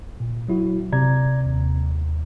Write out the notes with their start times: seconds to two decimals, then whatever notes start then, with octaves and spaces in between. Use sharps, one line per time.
0.20 A#2
0.48 F#3 E4 F#4
0.92 C3 D5 A#5 G#6
1.45 D#2